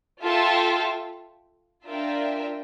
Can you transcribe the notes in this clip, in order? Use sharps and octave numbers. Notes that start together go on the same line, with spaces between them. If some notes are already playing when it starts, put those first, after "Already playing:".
F4 A4 E5 G5
D4 F4 A#4 E5 G5